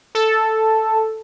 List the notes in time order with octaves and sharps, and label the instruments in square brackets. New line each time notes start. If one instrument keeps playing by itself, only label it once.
[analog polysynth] A4